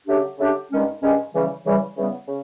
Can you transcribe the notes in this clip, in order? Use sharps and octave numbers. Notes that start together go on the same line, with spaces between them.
C#3 F#3 A3 D4 G4
C#3 F#3 A3 D4 G4
G2 D#3 G#3 C#4
G2 D#3 G#3 C#4
C#3 E3 G3
C#3 E3 G3
C#3 E3 G3 B3
C#3